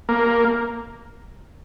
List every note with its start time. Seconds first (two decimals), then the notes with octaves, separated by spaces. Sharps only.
0.09 A#3